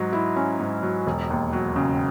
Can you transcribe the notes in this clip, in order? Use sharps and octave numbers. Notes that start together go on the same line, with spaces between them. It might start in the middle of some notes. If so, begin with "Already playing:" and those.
Already playing: G#2 F#3
E4
C#4
G#2
F#3
E1
D#2
F#3
C#3